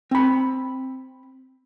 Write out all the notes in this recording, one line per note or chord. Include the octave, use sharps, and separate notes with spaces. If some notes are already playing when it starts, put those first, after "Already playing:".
C4 B5